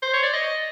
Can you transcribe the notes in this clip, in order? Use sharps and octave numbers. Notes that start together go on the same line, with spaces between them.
C5
C#5
D5
D#5